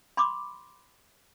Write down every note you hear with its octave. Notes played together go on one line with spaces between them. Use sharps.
B5 C6 D6